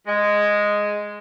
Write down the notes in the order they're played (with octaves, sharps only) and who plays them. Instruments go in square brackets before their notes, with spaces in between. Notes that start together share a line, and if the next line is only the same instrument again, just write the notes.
[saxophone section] G#3